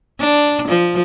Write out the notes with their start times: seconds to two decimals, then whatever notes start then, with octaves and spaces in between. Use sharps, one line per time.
0.20 D4
0.68 F3